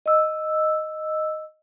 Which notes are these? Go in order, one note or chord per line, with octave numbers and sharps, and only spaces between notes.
D#5 E6